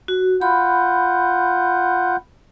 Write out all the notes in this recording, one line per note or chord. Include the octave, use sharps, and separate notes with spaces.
F#4
F4 F#5 B5 G6